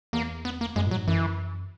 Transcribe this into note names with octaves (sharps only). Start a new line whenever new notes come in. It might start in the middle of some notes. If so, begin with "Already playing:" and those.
E2 A#3
B3
A#3
F#2 G#3
A#2
F#3
G#2
F#2 E3